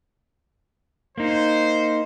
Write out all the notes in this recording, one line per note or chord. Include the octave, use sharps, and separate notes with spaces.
A#3 D#4 C5